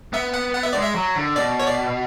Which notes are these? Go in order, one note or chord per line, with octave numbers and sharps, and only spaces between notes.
B3 E5
F#5
F#5
E5
G#3 D5
E5
F#3
D3
B2 D5
C#5
D5